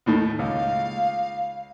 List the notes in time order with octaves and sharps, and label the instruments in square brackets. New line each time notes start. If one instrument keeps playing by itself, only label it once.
[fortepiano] D#2 A2 D#3
[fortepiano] C#2 [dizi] F5